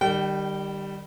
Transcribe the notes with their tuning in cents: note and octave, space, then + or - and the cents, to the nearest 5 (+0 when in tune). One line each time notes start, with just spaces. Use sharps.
D#3 -35 G3 +0 G5 -30